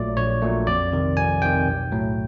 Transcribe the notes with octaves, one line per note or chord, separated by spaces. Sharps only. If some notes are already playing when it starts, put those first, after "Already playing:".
Already playing: A#1 A#2 F#3 A3 D5
A#1 C#5
A#2 F#3 A3
F2 D5
C3 D#3
F2 G#5
C3 D#3 G5
B1
A2 F#3 A3